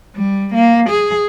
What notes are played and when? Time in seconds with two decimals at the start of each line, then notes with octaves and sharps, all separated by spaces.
0.16 G3
0.55 A#3
0.90 G#4